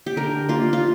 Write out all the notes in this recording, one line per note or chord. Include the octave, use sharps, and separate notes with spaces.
G4
D3 A#4
A#3 F4
F4